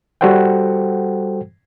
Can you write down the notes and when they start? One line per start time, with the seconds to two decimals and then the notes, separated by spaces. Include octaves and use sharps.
0.21 G3 F#4 A4 C5 F#5 G5